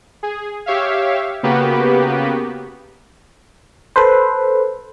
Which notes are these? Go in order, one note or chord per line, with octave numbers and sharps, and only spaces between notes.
G#4
G4 C#5 E5 F5
C#3 A#3 B3 F#4 G4 B4
A4 B4 C5